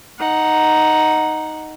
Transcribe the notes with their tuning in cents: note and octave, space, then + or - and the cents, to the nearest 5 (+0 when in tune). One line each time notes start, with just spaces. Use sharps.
D#4 +0 F#5 +0